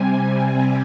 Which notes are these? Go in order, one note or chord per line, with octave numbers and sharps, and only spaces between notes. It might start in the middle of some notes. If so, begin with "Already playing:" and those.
Already playing: C3 G3 C4 G#5
G#5